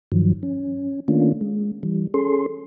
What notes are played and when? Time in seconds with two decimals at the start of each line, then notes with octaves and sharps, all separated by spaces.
0.12 G2 D#3 F3 F#3
0.43 C#4
1.08 D#3 A3 A#3 C#4 D4 F4
1.41 G#3
1.83 E3 G3
2.14 C#4 G#4 A4 C6